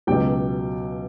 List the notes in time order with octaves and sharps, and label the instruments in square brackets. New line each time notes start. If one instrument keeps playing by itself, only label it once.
[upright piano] C#2 B2 F#3 G4 G5